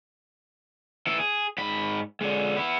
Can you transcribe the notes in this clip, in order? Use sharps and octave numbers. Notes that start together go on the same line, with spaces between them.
E3 A4
G#4
G#2 B5
D3 G#3
B3 E4